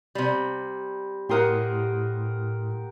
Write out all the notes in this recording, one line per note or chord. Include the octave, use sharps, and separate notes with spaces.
C3 G3
A2 G4 A#4 F#5 C6 D#6